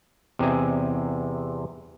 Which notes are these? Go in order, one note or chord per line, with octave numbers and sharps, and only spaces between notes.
E2 C3 C4 D#5 G#5